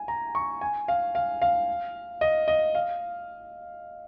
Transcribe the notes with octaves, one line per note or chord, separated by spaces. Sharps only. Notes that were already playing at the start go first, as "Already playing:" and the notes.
Already playing: G#5
A#5
C#6
G#5
F5
F5
F5
D#5
D#5
F5